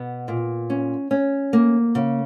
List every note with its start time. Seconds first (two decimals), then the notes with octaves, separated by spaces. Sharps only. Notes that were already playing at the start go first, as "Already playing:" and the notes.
Already playing: B2 B3
0.28 A#2
0.70 C#4
1.11 C#4
1.53 A#3
1.95 C#3